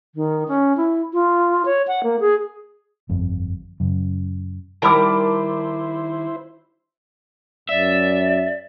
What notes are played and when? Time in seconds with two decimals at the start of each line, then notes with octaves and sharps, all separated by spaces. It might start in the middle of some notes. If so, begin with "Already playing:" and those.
0.15 D#3
0.48 C#4
0.77 E4
1.13 F4
1.65 C#5
1.88 F#5
2.04 A#3
2.20 G#4
3.09 G1 F2
3.80 F#2 C#3
4.82 D#3 G3 E4 A#4 C5 A5 B5 D6
7.69 F#2 D5 E5